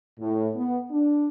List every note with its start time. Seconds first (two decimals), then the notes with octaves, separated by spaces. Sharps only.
0.19 A2
0.55 B3
0.91 D4